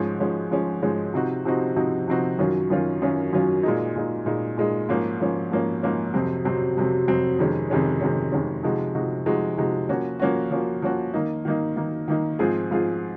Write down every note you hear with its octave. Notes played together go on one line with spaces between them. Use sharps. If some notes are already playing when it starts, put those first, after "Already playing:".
Already playing: G#2 F3 G#3 C#4
G#2 F3 G#3 C#4
G#2 F3 G#3 C#4
G#2 F3 G#3 C#4
C3 F3 C4 D#4 F#4
C3 F3 C4 D#4 F#4
C3 F3 C4 D#4 F#4
C3 F3 C4 D#4 F#4
F#2 D#3 F#3 C#4 F4
F#2 D#3 F#3 C#4 F4
F#2 D#3 F#3 C#4 F4
F#2 D#3 F#3 C#4 F4
A#2 G#3 D#4
A#2 G#3 D#4
A#2 G#3 D#4
A#2 G#3 D#4
G#2 F3 A#3 C#4
G#2 F3 A#3 C#4
G#2 F3 A#3 C#4
G#2 F3 A#3 C#4
F2 C3 F#3 C4
F2 C3 F#3 C4
F2 C3 F#3 C4
F2 C3 F#3 C4
F2 C3 D#3 G#3 C#4
F2 C3 D#3 G#3 C#4
F2 C3 D#3 G#3 C#4
F2 C3 D#3 G#3 C#4
C3 F3 G#3 D#4 F#4
C3 F3 G#3 D#4 F#4
C3 F3 G#3 D#4 F#4
C3 F3 G#3 D#4 F#4
F3 A#3 C#4 F#4
F3 A#3 C#4 F#4
F3 A#3 C#4 F#4
F3 A#3 C#4 F#4
D#3 A#3 D#4
D#3 A#3 D#4
D#3 A#3 D#4
D#3 A#3 D#4
G#2 F3 C4 F4 G#4
G#2 F3 C4 F4 G#4